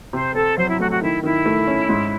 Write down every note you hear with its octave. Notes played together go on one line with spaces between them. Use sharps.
C3 C5
C4 A4
F#3 C5
E4
A3 F#4
F#4
D#3 E4
D#3 E4
A3
C#4
G#2